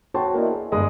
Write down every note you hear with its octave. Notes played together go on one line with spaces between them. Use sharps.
F#4 C#5 G5 A5 C6
A#3 E4 D5 D#5
G#4
G1 G#3 D#5 D#6